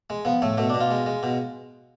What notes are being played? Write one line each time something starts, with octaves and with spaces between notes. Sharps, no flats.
G#3
F3 B3
A2 A3
B2 A3
B2 D4
F4
G#3
G#3
B2